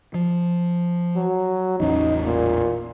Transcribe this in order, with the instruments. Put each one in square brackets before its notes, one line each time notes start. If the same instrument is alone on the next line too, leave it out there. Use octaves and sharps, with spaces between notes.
[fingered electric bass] F3
[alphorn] F#3
[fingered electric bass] A1 E2 C#4 [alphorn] D#4
[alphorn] A#2